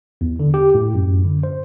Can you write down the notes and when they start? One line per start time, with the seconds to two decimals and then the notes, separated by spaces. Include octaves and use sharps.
0.21 E2
0.39 D3
0.54 G4
0.75 A2
0.95 F#2
1.25 D3
1.43 C5